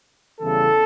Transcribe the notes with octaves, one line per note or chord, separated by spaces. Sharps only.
E2 C#3 E3 G3 A4